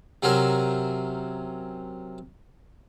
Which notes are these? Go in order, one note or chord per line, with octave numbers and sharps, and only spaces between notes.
C3 F#3 C4 C#4 A#4